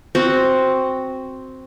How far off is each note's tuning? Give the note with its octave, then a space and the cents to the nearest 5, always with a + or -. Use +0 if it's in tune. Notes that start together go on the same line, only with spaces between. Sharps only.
C4 +0 F#4 +0